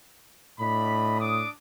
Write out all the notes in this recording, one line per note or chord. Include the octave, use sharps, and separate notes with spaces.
A2 D4 D#5 B5
D4 D6 D#6